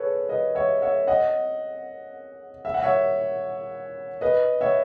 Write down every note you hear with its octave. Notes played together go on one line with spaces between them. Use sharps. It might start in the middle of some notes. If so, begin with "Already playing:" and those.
Already playing: G#4 A4 B4 C#5
B4 D#5
C#5 E5
C#5 E5
D#5 F#5
E5
F#5
C#5 E5
B4 D#5
C#5 E5